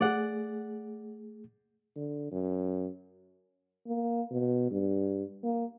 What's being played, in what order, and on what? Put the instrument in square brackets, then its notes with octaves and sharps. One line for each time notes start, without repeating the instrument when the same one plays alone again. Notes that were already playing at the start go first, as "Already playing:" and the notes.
[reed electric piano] A3 G#4 [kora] D5 F#5
[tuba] D3
F#2
[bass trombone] A#3
B2
G2
A#3